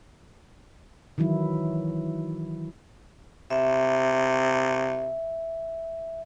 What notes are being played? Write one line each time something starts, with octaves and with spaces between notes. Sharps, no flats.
D#3 E3 F#3 E4
C3 E5